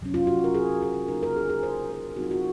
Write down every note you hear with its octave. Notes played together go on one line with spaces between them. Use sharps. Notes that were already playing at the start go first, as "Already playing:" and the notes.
C3 F#3 C#4
F4
F#4
A#4
G#4
G#4
C#3 F#3 A#3 D#4 A#4
A#4
G#4
G#4
C5
A#4
F#3 C4 D#4 F#4
F4
F#4